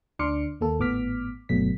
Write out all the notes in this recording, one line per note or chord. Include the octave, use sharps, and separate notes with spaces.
D2 D4 C6 D6 F6 C#7
D#2 A#3 A4
G#1 A2 B3 D6 F6 B6
G1 B2 F#3 A3 B6